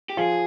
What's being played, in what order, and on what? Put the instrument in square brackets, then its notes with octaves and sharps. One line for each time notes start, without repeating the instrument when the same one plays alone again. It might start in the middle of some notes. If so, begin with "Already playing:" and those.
[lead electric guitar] G4
[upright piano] F3 F4 [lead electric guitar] G#4